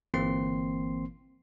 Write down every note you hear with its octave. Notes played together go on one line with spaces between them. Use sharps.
G1 E3 A#3 C4 C6 C7